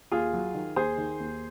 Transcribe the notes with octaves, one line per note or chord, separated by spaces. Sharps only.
D#2 F4 G#4
F#3
D#3
D#2 G#4 C5
D#3
D#2